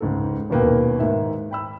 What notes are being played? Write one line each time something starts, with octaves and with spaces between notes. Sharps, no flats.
C#2 G#2 A4
D#1 D#2 B2 A#3 B4 G5
G#2 D#3 E5
G5 B5 E6